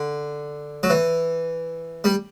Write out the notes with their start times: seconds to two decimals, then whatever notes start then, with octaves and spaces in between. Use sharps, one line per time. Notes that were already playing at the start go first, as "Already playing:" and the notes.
Already playing: D3
0.83 F#3
0.90 E3
2.04 G3